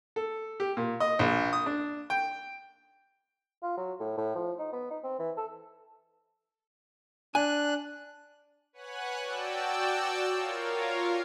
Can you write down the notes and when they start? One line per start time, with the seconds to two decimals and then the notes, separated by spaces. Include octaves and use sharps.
0.16 A4
0.60 G4
0.77 A#2
1.00 D#5
1.19 A#1
1.53 D#6
1.66 D4
2.10 G5
3.63 F4
3.77 F#3
4.00 A2
4.17 A2
4.35 F3
4.59 D#4
4.73 B3
4.91 D#4
5.04 C4
5.19 E3
5.37 A4
7.35 D4 G#5 F#6
8.73 B4 C#5 F#5 G#5 F#6
9.21 F#4 D5 G5 A5 E6
10.31 F4 A#4 C#5 F5